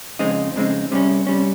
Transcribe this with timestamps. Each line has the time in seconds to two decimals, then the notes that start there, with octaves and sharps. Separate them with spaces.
0.19 F2 C#3 G#3 C4 D#4
0.56 F2 C#3 G#3 C4 D#4
0.91 C2 C3 G3 C#4
1.27 C3 G3 C#4